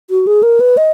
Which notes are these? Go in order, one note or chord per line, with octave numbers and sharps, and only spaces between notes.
F#4
G#4
A#4
B4
D#5